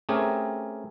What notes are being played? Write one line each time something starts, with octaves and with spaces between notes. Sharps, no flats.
A3 C4 C#4 G4 G#4 A#4